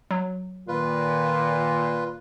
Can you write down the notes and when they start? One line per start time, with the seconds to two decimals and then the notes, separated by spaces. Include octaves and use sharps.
0.11 F#3
0.68 A#2 D#3 F4 B4